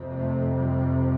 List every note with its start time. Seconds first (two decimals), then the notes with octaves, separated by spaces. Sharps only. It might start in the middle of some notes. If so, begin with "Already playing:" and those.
Already playing: F2 C3
0.11 A3
0.55 G3